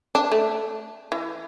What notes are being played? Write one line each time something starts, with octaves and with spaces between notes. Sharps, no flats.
D4
A3
E3